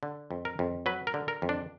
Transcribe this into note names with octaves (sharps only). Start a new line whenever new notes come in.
D3
F2
A#4
F2
F#3 B4
A#4
D3
A#4
F2
D4